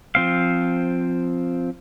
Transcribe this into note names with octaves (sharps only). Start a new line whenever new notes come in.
F3 C4 F5